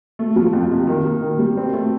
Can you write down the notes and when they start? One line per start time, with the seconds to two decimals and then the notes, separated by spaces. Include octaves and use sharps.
0.19 A3
0.36 F3
0.53 F2
0.71 C3
0.87 D#3
1.05 A#3
1.22 D#3
1.39 G3
1.57 C4
1.74 A3